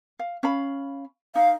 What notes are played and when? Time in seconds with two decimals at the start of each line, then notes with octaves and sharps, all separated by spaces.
0.19 F5
0.43 C#4 F5 B5
1.35 D#4 F5